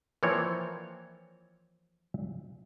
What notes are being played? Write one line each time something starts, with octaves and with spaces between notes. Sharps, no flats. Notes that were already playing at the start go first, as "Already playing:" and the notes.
E3 F3 A#3 C4 C#5 D5